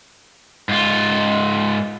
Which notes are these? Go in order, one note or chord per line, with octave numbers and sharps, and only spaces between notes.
G#2 F4